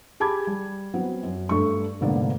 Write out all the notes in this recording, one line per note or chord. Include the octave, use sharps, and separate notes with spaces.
G4 G#4 A5 B5 D6 G#6
G3
F#3 B3 C4
F#2
G2 A3 D4 C#6
F1 G#2 D3 A#3 B3 D4